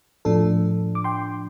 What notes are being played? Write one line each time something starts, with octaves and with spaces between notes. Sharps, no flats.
A2 F3 D4 A4
D6
G5 C6